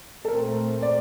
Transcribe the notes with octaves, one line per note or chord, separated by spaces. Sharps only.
A4
A#2 A3 C4 A#4
D5